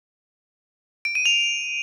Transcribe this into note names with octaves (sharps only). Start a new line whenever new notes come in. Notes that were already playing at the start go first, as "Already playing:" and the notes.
D7
D#7
F7